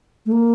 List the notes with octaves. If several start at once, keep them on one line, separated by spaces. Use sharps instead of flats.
A3
A#3